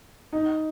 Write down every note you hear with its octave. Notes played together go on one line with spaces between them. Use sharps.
D#4